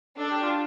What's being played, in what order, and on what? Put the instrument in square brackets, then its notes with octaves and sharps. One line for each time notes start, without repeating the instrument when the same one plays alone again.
[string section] D4 [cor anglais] A4
[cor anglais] G4
F4